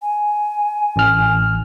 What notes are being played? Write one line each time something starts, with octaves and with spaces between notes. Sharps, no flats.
G#5
A1 F6